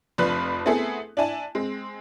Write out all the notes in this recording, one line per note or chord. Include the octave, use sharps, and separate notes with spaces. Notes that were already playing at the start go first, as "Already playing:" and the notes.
F1 F2 F3 D4 B4 F#6
A3 B3 C4 E4 G#4 A4
D4 E4 G#5 A5
G#3 C4